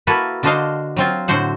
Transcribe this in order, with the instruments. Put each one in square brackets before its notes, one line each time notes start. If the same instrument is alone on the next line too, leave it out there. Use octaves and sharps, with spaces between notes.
[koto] A#3 E4 F#4 A4 B4
D3 D4 F#4 C5 D#5 F5
F#3 C4 F4
A2 D3 F#4 C5 F#5